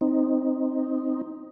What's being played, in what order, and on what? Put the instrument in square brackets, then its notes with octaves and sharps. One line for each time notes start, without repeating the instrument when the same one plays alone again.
[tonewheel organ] C4 D#4